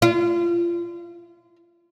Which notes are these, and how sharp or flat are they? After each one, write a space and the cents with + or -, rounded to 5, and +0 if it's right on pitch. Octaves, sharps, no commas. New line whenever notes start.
F4 -30